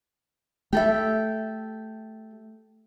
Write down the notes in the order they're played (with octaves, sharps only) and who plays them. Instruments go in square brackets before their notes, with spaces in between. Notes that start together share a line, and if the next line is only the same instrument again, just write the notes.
[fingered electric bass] A3 [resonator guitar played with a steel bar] G4 A4 E5